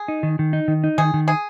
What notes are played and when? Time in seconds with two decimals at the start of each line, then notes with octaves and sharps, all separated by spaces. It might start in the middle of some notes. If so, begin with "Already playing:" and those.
Already playing: G#4
0.08 D#4
0.23 D#3
0.39 D#3
0.53 D#4
0.68 D#3
0.84 D#4
0.98 D#3 G#4
1.14 D#3
1.28 G#4